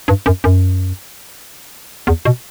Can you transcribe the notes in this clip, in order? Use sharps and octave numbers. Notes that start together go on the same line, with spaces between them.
G2
F#2
F#2
E2
B2